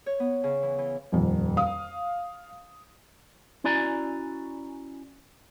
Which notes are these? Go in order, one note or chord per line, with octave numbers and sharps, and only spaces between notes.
C#5
B3
C#3
E3
E3
D#1 F2
F5 D#6
C#4 E4 F#4 D5 G#5 A#5